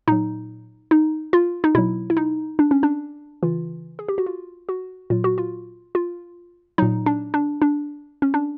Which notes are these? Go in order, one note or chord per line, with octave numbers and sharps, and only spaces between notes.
A#2 F#3 D#4
D#4
F4
D#4
B2 F#3 E4
E4
D#4
D4
C#4
D4
C#3 E3 F4
G#4
G4
F#4
F4
F#4
A#2 F#3 F4
F#4
F4
F4
A#2 F#3 D#4
D4
D4
D4
C#4
D4